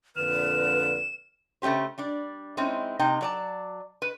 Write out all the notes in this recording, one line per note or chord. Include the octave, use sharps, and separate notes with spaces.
F2 A#2 D3 B4 F6 E7
C#3 A3 C#4 G4 C5
G3 D4 D5
G#3 C4 C#4 D#4 E4
C3 A#3 D#4 G5
F#3 D5 A5
B4